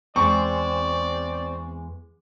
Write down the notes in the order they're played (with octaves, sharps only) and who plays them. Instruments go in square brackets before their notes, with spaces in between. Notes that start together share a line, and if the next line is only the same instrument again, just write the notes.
[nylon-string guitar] E2 G#3 [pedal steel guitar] C4 [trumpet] D5 [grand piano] C#6